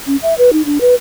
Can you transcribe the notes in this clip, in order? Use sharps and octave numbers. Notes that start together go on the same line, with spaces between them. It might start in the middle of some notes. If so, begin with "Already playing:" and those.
C#4
E5
B4
D#4
D4
B4